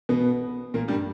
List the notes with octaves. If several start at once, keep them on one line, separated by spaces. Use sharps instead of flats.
B2 B3
A#2 A#3
G2 G3